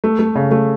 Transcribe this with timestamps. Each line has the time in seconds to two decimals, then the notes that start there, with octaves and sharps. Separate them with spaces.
0.04 A3
0.19 A3
0.36 C#3
0.51 A3